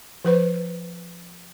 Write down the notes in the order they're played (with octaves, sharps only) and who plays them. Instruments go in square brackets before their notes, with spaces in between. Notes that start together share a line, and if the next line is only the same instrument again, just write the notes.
[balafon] F3 B4 C5